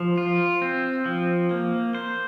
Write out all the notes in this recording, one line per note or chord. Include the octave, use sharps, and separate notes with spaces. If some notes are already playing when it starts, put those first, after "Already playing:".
Already playing: F3
F4
C4
F3
A#3
C5